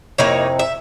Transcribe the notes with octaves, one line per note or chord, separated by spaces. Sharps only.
F2 C3 A#3 D#4 E4 C#5
E5